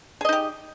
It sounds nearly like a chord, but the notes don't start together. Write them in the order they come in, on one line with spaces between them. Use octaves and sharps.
G#4 D#5 D#4 G4